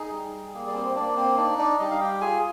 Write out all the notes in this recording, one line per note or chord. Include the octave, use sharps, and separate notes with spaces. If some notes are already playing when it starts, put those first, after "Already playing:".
Already playing: D#4 G#4
G3
A#3 G#4
D5
C4 C5
C5
A#3 D4 D5
C4 C5
D4 D#4 D5
D4 D5
G3 D#4 D#5
F5
G4 G5
F4 G#4 G#5